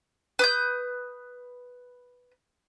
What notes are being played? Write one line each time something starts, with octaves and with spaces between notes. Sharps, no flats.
B4 D#6 G6